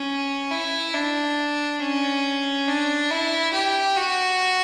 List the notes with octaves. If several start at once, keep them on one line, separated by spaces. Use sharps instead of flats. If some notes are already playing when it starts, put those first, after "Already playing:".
Already playing: C#4
E4
D4
C#4
D4
E4
G4
F#4